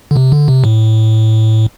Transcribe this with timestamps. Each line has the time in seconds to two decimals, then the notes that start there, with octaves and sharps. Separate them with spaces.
0.11 D3
0.16 C3
0.32 D3
0.48 C3
0.64 A2